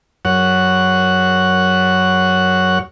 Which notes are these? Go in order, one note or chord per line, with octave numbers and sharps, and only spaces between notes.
F#2 C#5 F#5